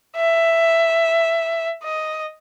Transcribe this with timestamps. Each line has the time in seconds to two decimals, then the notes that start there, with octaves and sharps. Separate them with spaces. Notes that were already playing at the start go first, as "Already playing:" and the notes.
0.17 E5
1.84 D#5